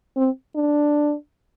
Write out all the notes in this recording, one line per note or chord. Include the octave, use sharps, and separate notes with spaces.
C4
D4